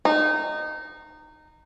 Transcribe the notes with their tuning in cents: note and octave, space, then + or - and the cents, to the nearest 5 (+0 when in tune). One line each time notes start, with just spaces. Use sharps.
D#4 -20